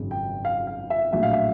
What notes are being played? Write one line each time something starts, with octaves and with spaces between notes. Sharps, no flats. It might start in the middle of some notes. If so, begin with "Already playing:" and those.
Already playing: G#1 F#2 C#3
G5
F5
F5
E5
A#1 A2 F#3 E5
F5
E5